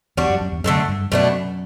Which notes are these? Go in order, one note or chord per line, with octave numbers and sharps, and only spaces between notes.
E2 G3 D4 F#4
F#2
F#2
E2
F#2 D3 A3 D4 A4
G2
F#2 B2 A3 D4